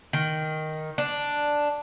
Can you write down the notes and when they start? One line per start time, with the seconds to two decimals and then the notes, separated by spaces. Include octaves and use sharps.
0.13 D#3
0.98 D4